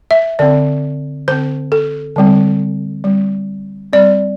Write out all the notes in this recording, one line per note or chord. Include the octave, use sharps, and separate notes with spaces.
E5
D3 C4 D5
D3 C4 C5
A4
D3 G3 C4
G3 C4
G3 C4 D5